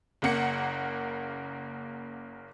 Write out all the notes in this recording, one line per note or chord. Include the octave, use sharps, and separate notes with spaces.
F#1 C#3 A#3 F#5 C#7